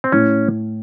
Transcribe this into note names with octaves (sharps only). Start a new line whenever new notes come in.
C4
A2 C#4